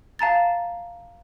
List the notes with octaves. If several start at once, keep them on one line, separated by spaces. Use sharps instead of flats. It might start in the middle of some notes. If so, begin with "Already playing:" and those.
F5 A5 A#5 A6